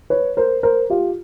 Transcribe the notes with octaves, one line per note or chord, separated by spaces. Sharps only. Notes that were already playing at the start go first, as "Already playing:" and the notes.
B4 C#5
A#4 C5
A#4 C5
F4 G4